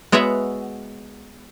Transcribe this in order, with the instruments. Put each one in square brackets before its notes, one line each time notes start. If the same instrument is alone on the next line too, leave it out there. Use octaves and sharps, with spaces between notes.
[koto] G#3 B3 F#4 C#5 E5 F#5